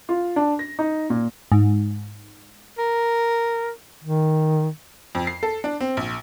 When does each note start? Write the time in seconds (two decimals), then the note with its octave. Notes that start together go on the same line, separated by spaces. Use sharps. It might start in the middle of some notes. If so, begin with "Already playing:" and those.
0.09 F4
0.36 D4
0.59 A#6
0.79 D#4
1.10 A#2
1.52 G#2
2.78 A#4
4.04 D#3
5.15 F2
5.27 C7
5.43 A4
5.64 D4
5.80 C4
5.97 A#1